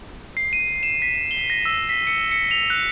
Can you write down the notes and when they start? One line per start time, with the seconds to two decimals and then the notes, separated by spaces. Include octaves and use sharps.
0.37 C7
0.53 D#7
0.83 E7
1.02 B6
1.31 G7
1.50 A#6
1.65 E6
1.89 B6
2.07 C#7
2.32 C#7
2.51 F7
2.70 F#6